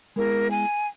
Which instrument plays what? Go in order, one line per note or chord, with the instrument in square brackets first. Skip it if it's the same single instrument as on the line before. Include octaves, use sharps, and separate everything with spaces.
[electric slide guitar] G#3 B3 E4 G#4 [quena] A#4
[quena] G#5